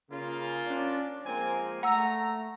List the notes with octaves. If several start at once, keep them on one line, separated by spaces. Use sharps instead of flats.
C#3 A#3 F4
C#4 D4
F3 G#3 A#3 C4 G#5
A3 F#5 A#5 E6